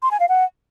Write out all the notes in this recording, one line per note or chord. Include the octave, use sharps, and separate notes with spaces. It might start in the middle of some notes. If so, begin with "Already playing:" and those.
C6
G#5
F5
F#5